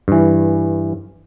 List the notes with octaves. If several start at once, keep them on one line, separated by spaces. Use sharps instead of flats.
G2 E3